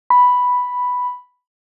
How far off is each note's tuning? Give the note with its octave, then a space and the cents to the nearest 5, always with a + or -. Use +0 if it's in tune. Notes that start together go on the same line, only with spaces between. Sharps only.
B5 +0